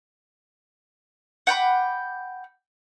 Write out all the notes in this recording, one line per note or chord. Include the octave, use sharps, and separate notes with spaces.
F#5 G5 B5 D6